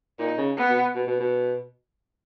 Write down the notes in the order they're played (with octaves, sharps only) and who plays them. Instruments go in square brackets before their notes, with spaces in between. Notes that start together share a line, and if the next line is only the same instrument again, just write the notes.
[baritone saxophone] A#2 [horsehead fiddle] D#4
[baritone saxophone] C#3
[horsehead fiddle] B3
[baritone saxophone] B2
B2
B2
B2